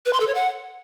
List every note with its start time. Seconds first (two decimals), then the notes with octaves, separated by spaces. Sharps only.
0.06 B4
0.13 C6
0.20 A4
0.28 C#5
0.35 F#5